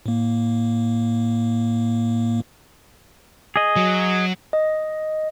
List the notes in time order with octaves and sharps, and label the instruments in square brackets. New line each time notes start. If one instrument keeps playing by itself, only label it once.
[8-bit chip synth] A2 A#3
[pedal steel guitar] G#4 D#5
[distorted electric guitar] F#3
[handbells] D#5